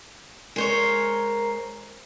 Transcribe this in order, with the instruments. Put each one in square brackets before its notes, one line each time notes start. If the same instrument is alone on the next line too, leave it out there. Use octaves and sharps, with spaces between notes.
[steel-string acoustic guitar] G#3 C5 C#5 [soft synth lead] A#4